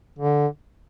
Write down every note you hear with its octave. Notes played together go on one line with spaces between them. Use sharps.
D3